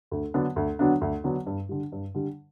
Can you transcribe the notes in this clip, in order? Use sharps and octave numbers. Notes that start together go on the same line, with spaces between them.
D2
D3 F#3 B3 D4
D2
D3 F#3 B3 D4
D2
D3 F#3 B3 D4
G2
D3 G3
G2
D3 G3